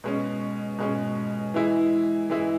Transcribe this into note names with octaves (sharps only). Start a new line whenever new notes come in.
B2 G#3 C#4
B2 G#3 C#4
E3 G#3 E4
E3 G#3 E4